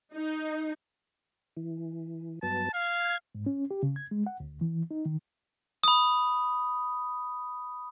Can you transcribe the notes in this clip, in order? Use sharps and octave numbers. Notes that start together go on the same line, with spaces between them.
D#4
E3
G2 F#3 B3 A5
F5 G#6
G#2
C#4
G4
C#3
G#6
G#3
F#5
D2
E3
D#4
D#3
B5 D#6